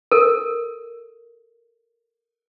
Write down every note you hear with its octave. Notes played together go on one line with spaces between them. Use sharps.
A4 A#4